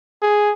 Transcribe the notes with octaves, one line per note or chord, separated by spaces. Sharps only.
G#4